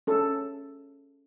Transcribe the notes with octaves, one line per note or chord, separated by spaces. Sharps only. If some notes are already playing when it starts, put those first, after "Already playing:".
C#4 A4